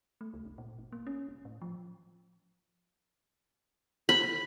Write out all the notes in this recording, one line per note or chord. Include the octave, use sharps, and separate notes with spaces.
A3
C#2
F#1
A#2
G1
A#3
C#4
F1
A2
F3
B5